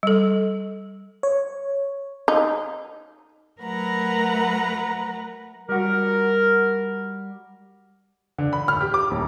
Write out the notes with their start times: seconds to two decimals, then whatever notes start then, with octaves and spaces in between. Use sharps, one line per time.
0.03 G3 A4
1.23 C#5
2.28 D#4
3.61 F#3 A3 A#4 B4 F#5 A#5
5.69 G3 F#4 A#4
8.38 D3
8.53 B5
8.68 F6
8.81 G4
8.94 D6
9.11 D#1